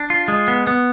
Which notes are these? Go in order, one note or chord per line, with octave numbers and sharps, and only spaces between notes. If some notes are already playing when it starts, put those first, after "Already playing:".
Already playing: D4
F4
G#3
B3
B3